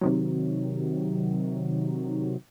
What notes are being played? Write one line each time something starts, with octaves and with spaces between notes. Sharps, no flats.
C3 D#3 F#3